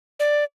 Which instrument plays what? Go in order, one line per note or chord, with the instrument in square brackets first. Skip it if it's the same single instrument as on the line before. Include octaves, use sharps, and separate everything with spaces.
[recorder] D5